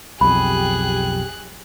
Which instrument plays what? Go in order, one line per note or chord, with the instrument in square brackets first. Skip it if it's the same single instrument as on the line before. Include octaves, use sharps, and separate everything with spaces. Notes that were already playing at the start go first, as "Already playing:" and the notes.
[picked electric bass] B1 F2 [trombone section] G4 [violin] G#4 F#6 [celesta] B5